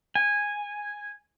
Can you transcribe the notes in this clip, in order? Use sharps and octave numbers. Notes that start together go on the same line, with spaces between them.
G#5